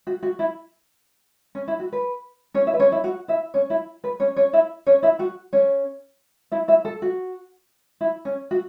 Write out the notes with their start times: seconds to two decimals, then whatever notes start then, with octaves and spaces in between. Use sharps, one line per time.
0.07 F#4
0.23 F#4
0.39 E4
1.55 C#4
1.68 E4
1.80 F#4
1.92 B4
2.54 C#4 C#5
2.67 E4 E5
2.74 B4
2.79 C#4 C#5
2.92 E4 E5
3.04 F#4 F#5
3.28 E4 E5
3.54 C#4 C#5
3.70 E4
4.04 B4
4.20 C#4 C#5
4.36 C#4 C#5
4.53 E4 E5
4.86 C#4 C#5
5.03 E4 E5
5.19 F#4 F#5
5.53 C#4 C#5
6.52 E4 E5
6.68 E4 E5
6.85 A4
7.02 F#4
8.01 E4
8.25 C#4
8.51 F#4